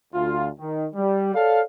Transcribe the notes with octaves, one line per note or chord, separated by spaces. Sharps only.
D2 F4
D#3
G3
A4 C#5 D5 F5